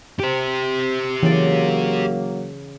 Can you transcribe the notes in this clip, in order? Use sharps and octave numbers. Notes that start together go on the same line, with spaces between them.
G4 C5
C#3 E3 F#3 A#3 D5